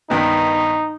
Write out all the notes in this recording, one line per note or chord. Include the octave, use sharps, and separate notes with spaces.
G2 D#3 B3 D#4